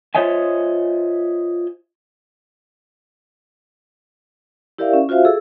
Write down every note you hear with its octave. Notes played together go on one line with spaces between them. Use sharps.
F4 C5 C#5 D#5 E5 G#5
E4 G4 A#4 D5 E5 F5
C#4
F4 F#4 C5 E5 F5
G#4 A4 E6